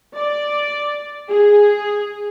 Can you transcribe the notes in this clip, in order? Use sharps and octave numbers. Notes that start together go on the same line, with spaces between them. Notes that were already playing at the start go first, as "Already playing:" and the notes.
D5
G#4